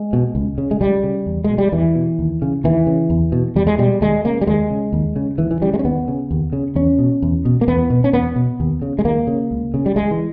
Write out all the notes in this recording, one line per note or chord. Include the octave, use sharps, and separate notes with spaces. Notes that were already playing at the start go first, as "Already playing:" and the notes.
Already playing: G#3
B2
C#2
C#3
G#3
C#2 G3
C#3
E2
B2 G#3
G3
E2 E3
B2
D#2
C#3
D#2 E3
C#3
E2
B2
E2 G3
G#3
B2 G3
D#2 G#3
C#3 A#3
G3
D#2 G#3
C#3
D#2
C#3
D#2 E3
E3
C#3 G3
G#3
C#4
D#2 B3
C#3
D#2
C#3
E2 C#4
B2
E2
B2
A#3
E2 B3
B2
C#4
E2 B3
B2
D#2
C#3
G#3
D#2 A#3
C#3
C#2
C#3
G3
C#2 G#3
E3